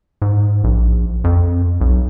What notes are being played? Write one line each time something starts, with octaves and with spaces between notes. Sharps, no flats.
G#2
A#1
F2
B1